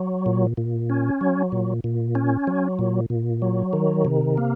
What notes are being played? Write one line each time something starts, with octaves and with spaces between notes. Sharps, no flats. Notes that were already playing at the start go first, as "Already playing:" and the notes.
Already playing: F#3
A#2
A#2
C#4
F#3
A#2
A#2
C#4
F#3
A#2
A#2
F#3
D#3
C3
A#3